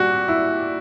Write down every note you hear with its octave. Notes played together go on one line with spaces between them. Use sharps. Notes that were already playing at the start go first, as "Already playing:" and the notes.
Already playing: A#2 G3 F#4
E4